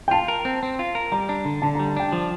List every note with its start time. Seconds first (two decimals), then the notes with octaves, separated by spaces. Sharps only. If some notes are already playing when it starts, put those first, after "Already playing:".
0.08 G5
0.11 F4 A5
0.28 A#4
0.45 C4
0.63 C4
0.79 F4
0.95 A#4
1.12 G3 A#5
1.29 D4
1.45 D3
1.62 D3 A5
1.75 A#5
1.79 G3
1.88 A5
1.97 D4 G5
2.12 F3 A5